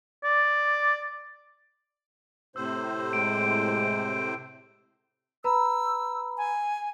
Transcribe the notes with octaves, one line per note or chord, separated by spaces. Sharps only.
D5
A2 C3 C5 E6
G#3 D7
B4 A#5 B5 E6
G#5